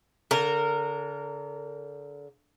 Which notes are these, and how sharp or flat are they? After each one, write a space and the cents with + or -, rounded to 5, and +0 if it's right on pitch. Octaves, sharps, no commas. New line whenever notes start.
D3 -35 A#4 -15